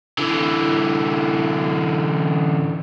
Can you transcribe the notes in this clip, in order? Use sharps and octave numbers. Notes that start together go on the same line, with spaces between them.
D3 E3